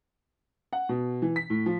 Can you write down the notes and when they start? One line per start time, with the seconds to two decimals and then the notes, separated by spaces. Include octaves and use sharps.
0.73 F#5
0.89 B2
1.22 E3
1.36 B6
1.50 A2
1.66 F3